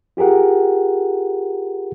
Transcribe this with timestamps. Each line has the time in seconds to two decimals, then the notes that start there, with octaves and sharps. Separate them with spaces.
0.17 F4 G4 G#4 A#4 F#5